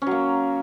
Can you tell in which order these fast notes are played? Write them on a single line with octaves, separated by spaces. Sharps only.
C#4 F#3 A#3